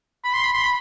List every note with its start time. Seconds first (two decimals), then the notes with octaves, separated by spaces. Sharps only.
0.24 B5
0.34 C6
0.43 B5
0.53 C6
0.63 B5